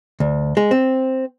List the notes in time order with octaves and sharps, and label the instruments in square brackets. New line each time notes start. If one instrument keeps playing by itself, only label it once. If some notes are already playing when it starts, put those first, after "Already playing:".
[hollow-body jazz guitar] D2
G#3
C4